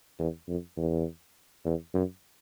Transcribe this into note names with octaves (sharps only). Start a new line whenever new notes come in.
E2
F2
E2
E2
F#2